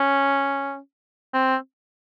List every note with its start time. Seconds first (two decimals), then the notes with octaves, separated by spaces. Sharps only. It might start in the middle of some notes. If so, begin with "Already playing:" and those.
Already playing: C#4
1.34 C4